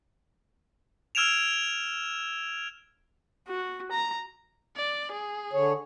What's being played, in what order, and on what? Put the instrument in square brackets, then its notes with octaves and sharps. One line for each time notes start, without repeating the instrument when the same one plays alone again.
[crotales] E6 F6 G#6 D7 E7 F7
[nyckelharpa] F#4
A#5
[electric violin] D5
G#4
[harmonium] D3 C#5